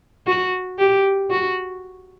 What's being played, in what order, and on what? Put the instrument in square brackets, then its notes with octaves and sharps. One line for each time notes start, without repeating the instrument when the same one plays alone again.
[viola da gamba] F#4
G4
F#4